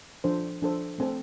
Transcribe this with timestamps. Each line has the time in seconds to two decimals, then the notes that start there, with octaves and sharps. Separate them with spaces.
0.24 F3 D4 A4 C5
0.62 F3 D4 A4 C5
0.98 A3 C4 A4 C5